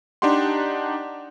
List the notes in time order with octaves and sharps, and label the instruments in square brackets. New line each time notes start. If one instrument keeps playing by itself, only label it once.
[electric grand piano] D4 D#4 G4 F#5 C6